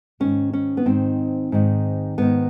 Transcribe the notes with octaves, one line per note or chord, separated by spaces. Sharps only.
G#2 D#3 C#4
C#4
B3
G#2 D#3 C4
G#2 D#3
G#2 D#3 B3